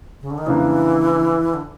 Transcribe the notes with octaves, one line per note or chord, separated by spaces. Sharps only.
C#3
D3
D#3
F2 C#3 E3 F3 A#3 D4
D3